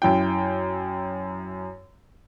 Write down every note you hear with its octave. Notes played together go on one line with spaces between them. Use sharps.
F#2 E4 G5